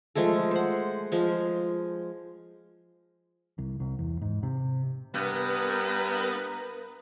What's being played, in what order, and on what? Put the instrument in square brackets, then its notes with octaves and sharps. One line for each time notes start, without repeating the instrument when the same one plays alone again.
[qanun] F3 G#3 A3 A4
C5 F#5
F3 G#3
[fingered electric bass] C2
C2
E2
G#2
C3
[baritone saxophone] G2 [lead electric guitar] B3 [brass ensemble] A#4 B4